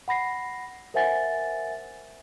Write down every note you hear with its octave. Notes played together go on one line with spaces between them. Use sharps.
F#5 B5 A#6 C7
A#4 C5 E5 F#5 G#5 A6